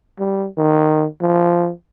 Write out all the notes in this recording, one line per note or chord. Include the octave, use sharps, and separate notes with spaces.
G3
D#3
F3